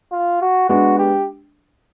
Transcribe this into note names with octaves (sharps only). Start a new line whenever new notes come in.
F4
F#4
G#3 B3 D4 F#4
G4